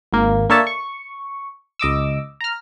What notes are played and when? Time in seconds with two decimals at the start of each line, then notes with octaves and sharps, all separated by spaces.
0.13 G#1 A#3
0.50 A#3 D4 A4 C#5 E5 A5
0.67 C#6
1.80 C#2 D#5 D6 E6
2.41 A#5 F6